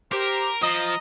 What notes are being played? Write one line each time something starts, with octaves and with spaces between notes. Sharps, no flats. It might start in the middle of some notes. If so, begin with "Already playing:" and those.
G4 A#4 C5
F3 D#5 A#5